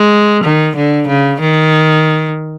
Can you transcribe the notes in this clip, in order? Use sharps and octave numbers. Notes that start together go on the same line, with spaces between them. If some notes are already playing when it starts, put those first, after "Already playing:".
Already playing: G#3
D#3
D3
C#3
D#3